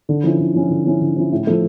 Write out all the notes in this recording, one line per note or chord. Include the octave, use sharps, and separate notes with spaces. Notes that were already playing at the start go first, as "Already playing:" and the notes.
D3
F3 C#4 E4
D3
F3 C#4 E4
D3
F3 C#4 E4
D3
F3 C#4 E4
A2
F3 A3